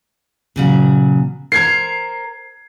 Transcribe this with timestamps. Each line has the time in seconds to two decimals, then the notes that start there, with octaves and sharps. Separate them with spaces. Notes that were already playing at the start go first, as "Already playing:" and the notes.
0.56 A#2 C#3 F#3
1.52 A#4 C5 A#5 G#6 C7